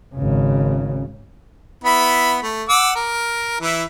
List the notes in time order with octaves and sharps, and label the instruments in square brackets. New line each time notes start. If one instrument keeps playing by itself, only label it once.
[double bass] G#1 C#3
[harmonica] B3 E4 B5
A3
F#5 D6 E6
A#4
E3 E4